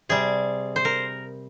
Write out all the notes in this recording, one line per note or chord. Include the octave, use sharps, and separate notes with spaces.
C3 G3 G#4
C5
A#4